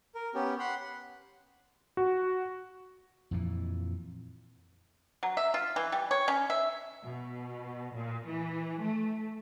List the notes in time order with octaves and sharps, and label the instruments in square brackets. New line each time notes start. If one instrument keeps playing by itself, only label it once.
[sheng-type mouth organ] A#4
B3 C#4 G4
F#5 B5 C6
[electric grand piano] F#4
[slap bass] F2 A#2 E3
[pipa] F#3
E5
F4
E3
G3
C#5
C#4
E5
[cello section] B2
A#2
E3
A3